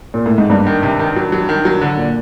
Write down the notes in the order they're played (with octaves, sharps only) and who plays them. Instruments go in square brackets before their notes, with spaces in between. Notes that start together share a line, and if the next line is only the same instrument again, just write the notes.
[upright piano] A#2
A2
G#2
[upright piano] G2 [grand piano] A#3
[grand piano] D#3
C3
D#3
F#3
F#3
D#3
F#3
D3
[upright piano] A#2